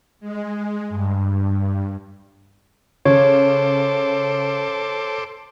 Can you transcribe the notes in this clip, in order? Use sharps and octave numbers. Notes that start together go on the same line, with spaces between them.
G#3
G2
C#3 A4 C5 C#5 D6